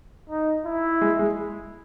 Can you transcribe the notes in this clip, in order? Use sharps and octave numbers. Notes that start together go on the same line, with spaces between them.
D#4
E4
G#3
G#3